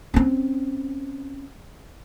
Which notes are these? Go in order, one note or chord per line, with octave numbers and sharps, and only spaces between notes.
C4 C#4